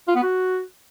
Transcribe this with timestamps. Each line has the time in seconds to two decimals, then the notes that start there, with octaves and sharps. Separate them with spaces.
0.08 F4
0.15 B3
0.23 F#4